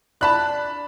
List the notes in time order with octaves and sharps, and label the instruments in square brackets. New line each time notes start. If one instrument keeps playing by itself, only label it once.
[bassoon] D4 [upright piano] A5 B5 F#6